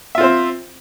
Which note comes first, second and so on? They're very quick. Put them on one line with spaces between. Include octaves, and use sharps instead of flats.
E5 F4 C4 C5